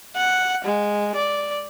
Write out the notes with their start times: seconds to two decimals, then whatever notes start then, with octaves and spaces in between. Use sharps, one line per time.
0.17 F#5
0.65 G#3
1.15 D5